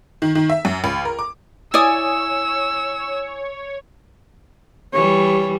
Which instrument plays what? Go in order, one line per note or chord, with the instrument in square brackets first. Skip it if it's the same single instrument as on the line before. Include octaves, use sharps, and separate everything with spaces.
[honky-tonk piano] D#3
D#3
E5
F#2
C#2
A#4
D6
[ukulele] E4 D5 [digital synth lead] C#5 [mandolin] G#5 D#6 [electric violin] E6
[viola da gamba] E3 G3 [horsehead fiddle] C#5